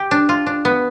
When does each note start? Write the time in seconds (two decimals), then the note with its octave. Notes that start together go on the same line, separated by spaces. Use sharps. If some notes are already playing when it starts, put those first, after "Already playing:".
Already playing: G4
0.11 D4
0.29 F4
0.46 D4
0.65 B3